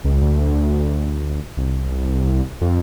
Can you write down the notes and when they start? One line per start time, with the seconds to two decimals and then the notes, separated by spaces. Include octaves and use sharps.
0.05 C#2
0.21 D2
1.57 C2
2.61 F2